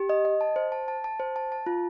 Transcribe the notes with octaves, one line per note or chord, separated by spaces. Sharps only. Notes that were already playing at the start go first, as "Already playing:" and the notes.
Already playing: G4
D#5
D#5
A5
C5
A5
A5
A5
C5
A5
A5
F4